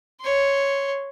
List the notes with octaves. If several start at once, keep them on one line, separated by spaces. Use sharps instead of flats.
C#5 C6